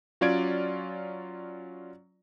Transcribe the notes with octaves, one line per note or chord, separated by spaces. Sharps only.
F#3 C#4 F4 D5 G#6 D7